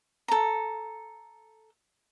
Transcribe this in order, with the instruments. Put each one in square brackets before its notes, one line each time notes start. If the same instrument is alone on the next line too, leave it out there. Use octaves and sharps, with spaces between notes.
[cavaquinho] A4 A#5